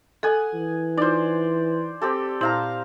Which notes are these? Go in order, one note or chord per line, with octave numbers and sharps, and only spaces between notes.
A4 F#5 G#5 D#6
E3
D#4 F4 C5 D5
C4 G4 A4
A#2 E4 C5 F5 A#5